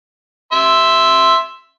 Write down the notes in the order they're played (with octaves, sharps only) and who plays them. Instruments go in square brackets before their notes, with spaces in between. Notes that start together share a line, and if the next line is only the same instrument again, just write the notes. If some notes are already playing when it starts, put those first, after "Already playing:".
[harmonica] E5 C6